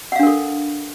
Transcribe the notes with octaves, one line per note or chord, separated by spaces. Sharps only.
D4 A4 A#4 F5 F#5